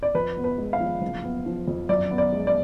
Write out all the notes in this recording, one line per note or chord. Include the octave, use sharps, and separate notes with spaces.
D5
F2 B4
B3
B4
G#3
F5
F3
F#1
B3
F3
F2
F#2 D5
B3
D5
G#3
D5